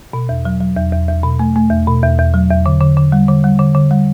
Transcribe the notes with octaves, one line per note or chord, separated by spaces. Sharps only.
B2
E2
F#3
F#3
E2
E2
E2
B2
A3
A3
E2
B2
E2
E2
F#3
E2
D3
D3
D3
G3
D3
G3
D3
D3
G3